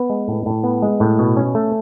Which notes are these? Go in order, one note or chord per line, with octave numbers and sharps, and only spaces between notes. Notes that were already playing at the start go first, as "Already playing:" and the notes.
Already playing: B3 B4
G#3
A2
A2
B3
G#3
A2
B2
C#4
A3